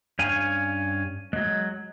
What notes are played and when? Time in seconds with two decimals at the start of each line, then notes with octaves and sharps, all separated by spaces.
0.19 G2 C#4 F5 G#5
1.33 F#3 G#3